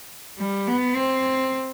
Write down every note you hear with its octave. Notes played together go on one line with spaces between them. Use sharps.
G3
B3
C4